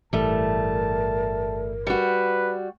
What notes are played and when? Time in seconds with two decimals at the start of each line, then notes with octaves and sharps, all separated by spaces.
0.13 G1 A2 E3 G3 A3 A#4 A5
1.87 G3 F#4 B4